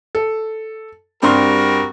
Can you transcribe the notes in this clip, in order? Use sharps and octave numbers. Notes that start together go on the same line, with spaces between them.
A4
G2 G3 C4 F#4 A#4 C6